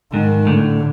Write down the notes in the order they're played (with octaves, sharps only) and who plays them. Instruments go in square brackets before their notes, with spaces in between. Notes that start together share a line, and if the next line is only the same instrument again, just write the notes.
[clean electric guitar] G#2 [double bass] D#3
[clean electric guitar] A2 [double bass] D3